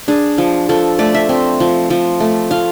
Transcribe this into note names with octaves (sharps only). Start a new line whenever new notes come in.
D4 G#4
F3
F3 A4
A3 D5
E5
C4
F3
F3
A3
F4 F5